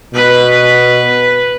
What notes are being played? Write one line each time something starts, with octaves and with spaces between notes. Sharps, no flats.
B2 B4